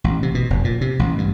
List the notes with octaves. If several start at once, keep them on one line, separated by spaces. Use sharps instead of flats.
A1
C3
B2
F1
A#2
C3
A1
G2